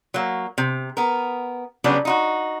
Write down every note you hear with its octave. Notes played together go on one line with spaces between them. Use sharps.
F#3 A#3
C3
B3 A#4
C#3 F#3 G3 B3 D4
D#4 F4 F#4